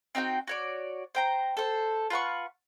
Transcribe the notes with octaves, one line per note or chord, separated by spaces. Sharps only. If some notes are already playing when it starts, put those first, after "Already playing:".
C4 D#4 F#4 G5
F#4 C#5 D5
C5 G5 A#5
A4 C5
F4 B4 F#5 C#6